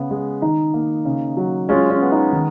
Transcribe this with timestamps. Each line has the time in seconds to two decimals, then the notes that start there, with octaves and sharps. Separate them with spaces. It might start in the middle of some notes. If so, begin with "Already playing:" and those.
Already playing: C#3 B3
0.11 G#3
0.42 D#3 D#4
0.74 A#3
1.05 C#3
1.37 F#3
1.69 G#3 C#4 F4
1.90 C#4
2.01 B3
2.12 D#4
2.33 D#3